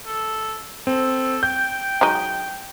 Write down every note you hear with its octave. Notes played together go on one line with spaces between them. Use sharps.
A4
C4 A4
G5 G6
F#3 G#3 D#4